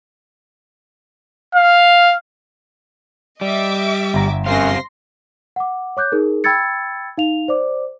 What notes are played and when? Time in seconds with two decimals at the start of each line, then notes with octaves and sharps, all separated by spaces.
1.55 F5
3.41 G3 D#5 E5 D6
4.14 G1 A#5
4.46 F#2 C3 C5 F5 C6 A#6
5.56 F#5 D6
5.97 C#5 D6 F#6 G6
6.12 D#4 G#4 A#4
6.44 G5 B5 E6 G#6 A6 C#7
7.17 D#4 F5 F7
7.48 C5 D5 D6